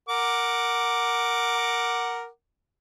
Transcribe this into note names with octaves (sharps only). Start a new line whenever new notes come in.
A#4 F#5 D6